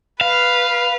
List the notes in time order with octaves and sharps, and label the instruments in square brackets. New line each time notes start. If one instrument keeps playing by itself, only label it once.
[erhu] B4 [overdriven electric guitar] F5